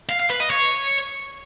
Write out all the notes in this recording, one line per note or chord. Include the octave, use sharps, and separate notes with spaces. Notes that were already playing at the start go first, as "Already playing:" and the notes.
F5
F5
B4
D#5
C#5